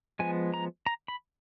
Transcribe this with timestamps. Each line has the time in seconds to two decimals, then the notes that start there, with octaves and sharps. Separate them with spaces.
0.19 F3 G#3 B3 G#5
0.54 A#5
0.86 A#5
1.08 B5